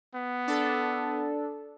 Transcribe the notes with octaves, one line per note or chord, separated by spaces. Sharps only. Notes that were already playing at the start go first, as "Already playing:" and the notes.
B3
D4 A4